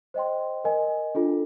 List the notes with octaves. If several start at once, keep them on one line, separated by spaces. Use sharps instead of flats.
C5 D#5 G5 C6
A#4 D#5 G#5
D4 F4 A4